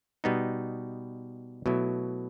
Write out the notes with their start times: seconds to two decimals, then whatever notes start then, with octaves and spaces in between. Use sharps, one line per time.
0.24 B2 G3 B3 D#4
1.66 B2 F#3 A3 E4